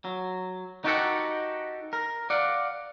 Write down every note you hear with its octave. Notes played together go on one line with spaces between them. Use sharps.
F#3
D#4 F#4 G4 A4 A#4 F#5
A#4
D5 F5 F#5